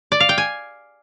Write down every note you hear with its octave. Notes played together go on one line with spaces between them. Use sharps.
D5
F5
G5
G#5